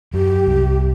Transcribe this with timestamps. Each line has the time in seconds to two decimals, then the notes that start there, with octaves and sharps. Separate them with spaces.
0.14 F#2 G4
0.47 C2